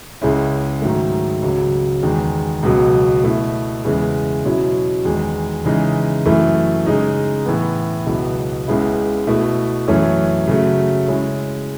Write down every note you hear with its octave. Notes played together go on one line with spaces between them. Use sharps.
C#2 C#3 G#3 C#4 E4
G#2 D#3 F#3 A3
C#2 C#3 F#3
E2 D#3 G#3
C#2 B2 F#3
B2 A3 E4
E2 C#3 E3 G#3
B2 F#3 C#4 E4
E2 D#3 G#3
C#3 E3 G#3 D#4
F#2 E3 A3 E4
C#3 G#3 D#4
A2 E3 B3
C#2 B2 F#3 B3 E4
C#2 C#3 G#3 B3 E4
B2 A3 E4
F#2 E3 A3 C#4
C#3 F#3 A3
C#3 G#3 C#4 E4